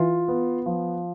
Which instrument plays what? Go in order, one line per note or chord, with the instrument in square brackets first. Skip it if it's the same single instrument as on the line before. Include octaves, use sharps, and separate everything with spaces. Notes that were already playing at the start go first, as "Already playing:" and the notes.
Already playing: [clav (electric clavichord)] E3 [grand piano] F4
[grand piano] B3
F3